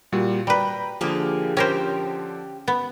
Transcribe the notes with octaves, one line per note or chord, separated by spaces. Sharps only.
A#2 G3 F#4
G3 B4 G5 A#5
D3 F3 A#3 G4 G#4
C#4 G4 A#4 C5
B3